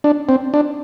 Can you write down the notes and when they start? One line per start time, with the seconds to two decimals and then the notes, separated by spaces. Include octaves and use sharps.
0.04 D4
0.29 C4
0.54 D4